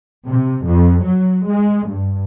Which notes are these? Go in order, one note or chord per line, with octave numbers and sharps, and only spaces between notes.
C3
F2
F#3
G#3
G2